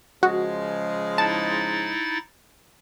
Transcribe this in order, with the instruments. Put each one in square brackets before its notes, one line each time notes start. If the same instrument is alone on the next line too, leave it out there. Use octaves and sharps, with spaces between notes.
[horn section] C#3 F3 G#3 [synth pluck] F#4
[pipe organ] D#4 E4 A6 [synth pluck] A5